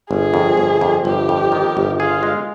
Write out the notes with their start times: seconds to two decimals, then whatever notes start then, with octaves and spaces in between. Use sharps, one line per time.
0.10 G1 G#4
0.34 F2
0.57 G1
0.81 F2
1.05 G1 G4
1.29 F2
1.52 D#3
1.77 G1
2.00 F4 G#4
2.23 G#3